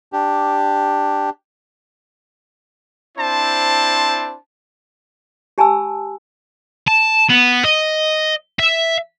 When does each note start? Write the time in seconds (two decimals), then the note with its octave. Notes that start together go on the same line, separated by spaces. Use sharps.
0.13 D4 G4
3.18 C4 D4 E4 C5 A5
5.58 G4 G#5 A5 B5 E6
6.88 A5
7.29 B3
7.65 D#5
8.59 E5